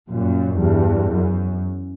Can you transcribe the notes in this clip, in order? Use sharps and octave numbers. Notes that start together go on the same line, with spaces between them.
F#2 A#2
E2 G2
F#2